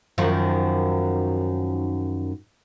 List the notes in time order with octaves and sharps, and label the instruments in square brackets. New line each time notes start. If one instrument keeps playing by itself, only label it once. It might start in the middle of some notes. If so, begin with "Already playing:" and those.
[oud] F#2 D#3 F3